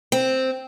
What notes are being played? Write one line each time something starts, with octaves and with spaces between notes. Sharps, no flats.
C4